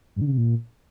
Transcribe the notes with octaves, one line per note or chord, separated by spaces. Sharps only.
G2
D3
C#3
C3
A#2